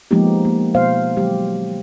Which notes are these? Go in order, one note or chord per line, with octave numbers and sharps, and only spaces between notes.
F3 G#3 A#3 B3 D#4 G4
A#3
B2 B3 C5 F5
D#3 F#3 G#3 G4